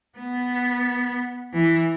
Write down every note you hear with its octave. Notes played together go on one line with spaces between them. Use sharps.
B3
E3